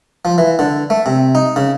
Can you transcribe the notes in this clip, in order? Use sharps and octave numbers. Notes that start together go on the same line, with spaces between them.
F3
E3
D3
A3
C3
D#4
C#3